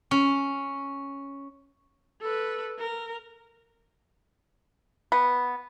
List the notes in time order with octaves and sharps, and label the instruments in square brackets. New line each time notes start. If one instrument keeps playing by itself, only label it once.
[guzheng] C#4
[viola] A4 B4
A#4
[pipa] B3